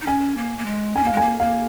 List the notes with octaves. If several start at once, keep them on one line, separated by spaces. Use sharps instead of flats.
D#4
C#4 G#5
A#3
A#3
G#3
C#4 G#5
A#3 F5
G#3
A#3 G#5
A#3 F5